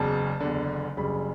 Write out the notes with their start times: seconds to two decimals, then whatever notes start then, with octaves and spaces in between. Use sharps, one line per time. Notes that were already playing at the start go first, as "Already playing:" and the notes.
Already playing: F#1 E2 C#3 A5
0.40 F#1 E2 D3
0.97 F#1 F#2 C#3 G3 B5